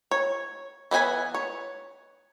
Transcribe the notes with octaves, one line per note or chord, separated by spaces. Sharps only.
C#5
E3 B3 D#4 G#5 B5
C#5